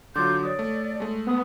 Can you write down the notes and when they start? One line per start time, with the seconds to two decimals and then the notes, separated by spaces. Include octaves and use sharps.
0.15 D3 F#3 F4 C6 D6 G6 A6
0.43 C#5 D5 D#6
0.59 A3
1.00 G#3 A3
1.27 B3 D#6